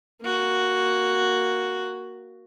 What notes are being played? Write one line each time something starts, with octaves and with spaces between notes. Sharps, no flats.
A#3 F#4